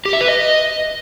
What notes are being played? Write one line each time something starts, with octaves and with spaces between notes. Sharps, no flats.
G4
E5
B4
D#5